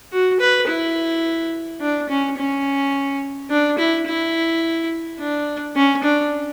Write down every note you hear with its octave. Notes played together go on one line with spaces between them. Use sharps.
F#4
B4
E4
D4
C#4
C#4
D4
E4
E4
D4
C#4
D4